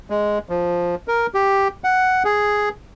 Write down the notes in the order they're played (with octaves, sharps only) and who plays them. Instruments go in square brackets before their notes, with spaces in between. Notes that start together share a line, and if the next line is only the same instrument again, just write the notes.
[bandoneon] G#3
F3
A#4
G4
F#5
G#4